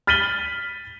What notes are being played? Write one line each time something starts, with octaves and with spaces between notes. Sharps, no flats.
F6 A6 B6 D#7 F#7 G7